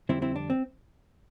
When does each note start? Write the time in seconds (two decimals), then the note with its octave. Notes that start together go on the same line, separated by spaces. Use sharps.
0.09 F2 D3 G3 C4 E4
0.22 C4 E4
0.36 D4
0.50 C4